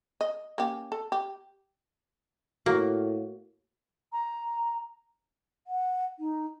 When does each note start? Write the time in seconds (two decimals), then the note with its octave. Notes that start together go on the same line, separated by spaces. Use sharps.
0.21 D#5
0.58 A#3 C#4 G4
0.92 A4
1.12 G4
2.66 A2 A#3 F#4
4.12 A#5
5.67 F#5
6.19 D#4